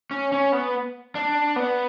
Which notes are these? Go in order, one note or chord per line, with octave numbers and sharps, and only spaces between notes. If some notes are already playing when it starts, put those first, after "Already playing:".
C#4
C#4
B3
D4
B3